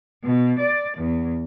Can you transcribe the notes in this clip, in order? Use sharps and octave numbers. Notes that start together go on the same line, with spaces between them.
B2
D5
E2